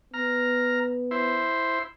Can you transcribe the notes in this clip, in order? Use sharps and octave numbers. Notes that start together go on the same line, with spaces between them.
B3 A#5 F6
E4 C5